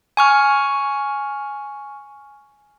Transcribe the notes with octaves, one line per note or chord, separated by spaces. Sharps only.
G#5 C#6 F6